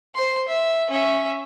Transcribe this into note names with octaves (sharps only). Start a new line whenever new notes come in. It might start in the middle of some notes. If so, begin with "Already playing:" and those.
C5 C6
E5
C#4 E5